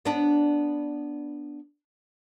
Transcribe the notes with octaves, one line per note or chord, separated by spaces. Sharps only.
B3 D4